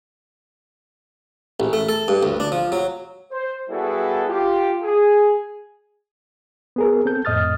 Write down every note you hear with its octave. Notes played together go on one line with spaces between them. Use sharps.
A1
A3
A4
G2
D2
D4
F3
F#3
C5
G3 B3 E4 F#4 G#4 A4
F4 G4
G#4
B3 G#4 A#4
C4 A4 G6
F2 A2 D#5 D#6 F6 A6